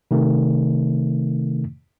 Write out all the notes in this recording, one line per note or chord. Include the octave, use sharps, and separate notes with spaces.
C3 D#3 A3